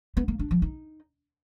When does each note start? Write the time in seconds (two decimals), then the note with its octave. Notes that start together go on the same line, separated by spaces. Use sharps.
0.17 B3
0.28 A#3
0.39 D4
0.51 F3
0.62 D#4